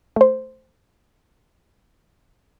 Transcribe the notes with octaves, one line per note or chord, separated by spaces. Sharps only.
A3 C5